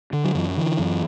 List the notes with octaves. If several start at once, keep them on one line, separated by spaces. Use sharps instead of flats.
D3
F#3
F#2 E3
F#3
D3 E3
F#2